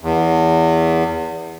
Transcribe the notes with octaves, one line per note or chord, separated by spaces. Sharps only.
E2